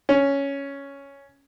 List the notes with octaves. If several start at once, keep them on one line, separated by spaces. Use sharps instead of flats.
C#4